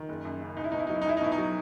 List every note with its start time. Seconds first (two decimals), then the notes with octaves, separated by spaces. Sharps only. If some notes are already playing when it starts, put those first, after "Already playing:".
Already playing: D#3
0.09 F#1
0.25 F#2
0.41 C#3
0.57 C#2 D#4
0.64 E4
0.72 B2 D#4
0.79 E4
0.87 F#3 D#4
0.94 E4
1.02 D#4
1.05 B1 E4
1.17 D#4
1.21 B2 E4
1.32 D#4
1.38 F#3